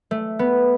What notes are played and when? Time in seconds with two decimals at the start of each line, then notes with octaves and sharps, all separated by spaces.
0.11 A3
0.39 B3